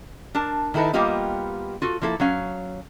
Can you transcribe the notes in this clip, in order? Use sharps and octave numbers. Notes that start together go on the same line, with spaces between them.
D4 A#4 A5
D#3 D#4 E4 A4 B4
G3 A#3 B3 F4 G4 D#5
F4 F#4 A4
F3 A#3 E4 A4
F#3 C#4 F5